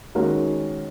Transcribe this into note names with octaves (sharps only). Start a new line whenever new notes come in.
D#3 G#3 C#4 F#4 A#4